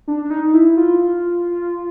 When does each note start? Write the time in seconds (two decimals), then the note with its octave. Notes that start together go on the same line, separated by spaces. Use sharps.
0.08 D4
0.25 D4
0.30 D#4
0.54 E4
0.77 F4